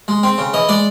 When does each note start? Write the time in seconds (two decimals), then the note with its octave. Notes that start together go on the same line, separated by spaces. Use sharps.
0.08 G#3
0.23 C4
0.38 C#3
0.54 E3 D#5
0.69 G#3 D5